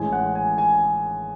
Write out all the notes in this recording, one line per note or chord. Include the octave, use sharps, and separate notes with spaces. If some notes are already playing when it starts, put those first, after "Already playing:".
Already playing: A1 A2 G#3 G#5
F#5
G#5
G#5